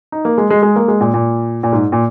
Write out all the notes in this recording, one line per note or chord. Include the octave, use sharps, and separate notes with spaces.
D#4
A#3
G#3
G#3
G#3
A#3
G#3
A#2
A#2
A#2
G#2
A#2